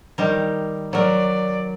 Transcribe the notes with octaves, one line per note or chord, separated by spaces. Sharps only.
D#3 G3 A#4
F#3 A#4 D5